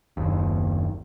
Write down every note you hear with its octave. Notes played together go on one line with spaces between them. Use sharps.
F#1 D#2